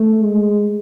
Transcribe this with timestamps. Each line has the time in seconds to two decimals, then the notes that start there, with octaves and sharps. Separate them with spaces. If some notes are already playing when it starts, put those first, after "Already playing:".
Already playing: A3
0.23 G#3